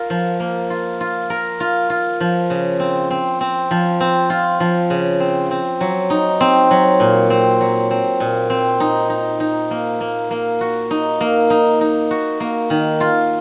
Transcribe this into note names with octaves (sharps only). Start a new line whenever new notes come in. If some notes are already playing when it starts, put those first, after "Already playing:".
Already playing: F4 A#4
F3
A#3
F4
F4
A#4
F4
F4
F3
C#3
C4
C4
C4
F3
C4
F4
F3
C#3
C4
C4
F#3
D#4
C4
F#3
A#2
C4
F#3
C4
A#2
C4
D#4
D#4
D#4
A#3
A#3
A#3
F#4
D#4
A#3
D#4
D#4
F#4
A#3
D#3
F4